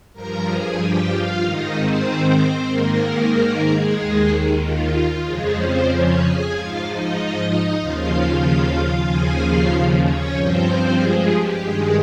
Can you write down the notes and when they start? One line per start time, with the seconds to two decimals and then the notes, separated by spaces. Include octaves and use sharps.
0.13 G2 F3 A#4 A#5
0.46 G#4 G#5
0.77 G4 G5
1.09 F4 F5
1.41 G#2 D#3 D#4 D#5
1.73 C4 C5
2.37 C4 C5
2.69 G#2 D#3 A#3 A#4
3.32 A#3 A#4
3.64 G#3 G#4
3.97 D#2 D#3
4.60 F4
5.24 F2 C#3 F3 G#3 G#4
5.56 C4 C5
5.87 C#4 C#5
6.19 G#4 G#5
6.51 G#2 F3 F4 F5
6.83 D#4 D#5
7.47 D#4 D#5
7.79 D#2 C#3 F3 F4 F5
9.07 D#2 C#3 F3 G#4 G#5
9.38 F4 F5
10.03 C#4 C#5
10.34 G2 F3 C4 C5
10.97 G#3 G#4
11.30 G4
11.62 G2 D#3 G#3 G#4